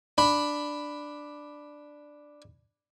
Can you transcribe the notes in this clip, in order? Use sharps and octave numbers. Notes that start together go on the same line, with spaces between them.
D4 B5